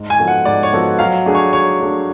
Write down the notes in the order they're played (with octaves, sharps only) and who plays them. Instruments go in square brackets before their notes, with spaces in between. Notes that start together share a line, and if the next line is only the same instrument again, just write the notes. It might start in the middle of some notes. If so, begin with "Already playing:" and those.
Already playing: [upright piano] G#2
[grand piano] G#5
[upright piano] F3 B3 F#4 A4
[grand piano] F#5
[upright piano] G#2 [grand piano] D5
[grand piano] C#5
[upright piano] F3 B3 F#4 A4
[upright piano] F#3 [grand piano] F5
[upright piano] A3 D4 G#4
[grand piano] C#5
[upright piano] F#3 [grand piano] C#5
[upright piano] A3 D4 G#4